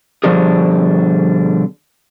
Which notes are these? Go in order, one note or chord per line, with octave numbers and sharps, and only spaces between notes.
B2 D3 F3 G3 D4 G#4